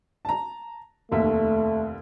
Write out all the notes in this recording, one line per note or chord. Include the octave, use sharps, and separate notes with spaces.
A5 A#5
F1 D#2 A3 E5